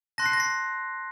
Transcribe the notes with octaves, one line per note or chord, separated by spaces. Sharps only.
A5 C6 F#6 A#6
C7
A#6
C7